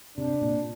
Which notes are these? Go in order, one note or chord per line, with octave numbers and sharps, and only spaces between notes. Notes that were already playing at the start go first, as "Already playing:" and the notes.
C3 D4
A#2